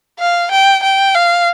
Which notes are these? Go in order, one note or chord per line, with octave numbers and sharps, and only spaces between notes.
F5
G5
G5
F5